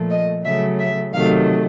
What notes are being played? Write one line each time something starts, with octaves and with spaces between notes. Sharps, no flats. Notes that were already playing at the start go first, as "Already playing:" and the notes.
Already playing: A#2 F3 A3
D#5
C#3 F#3 A3 E5
E5
C3 D#3 F#3 A3 F5